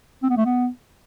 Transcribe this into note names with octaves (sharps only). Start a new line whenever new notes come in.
C4
B3
A3
B3